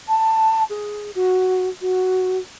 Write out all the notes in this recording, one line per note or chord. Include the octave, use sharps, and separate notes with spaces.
A5
G#4
F#4
F#4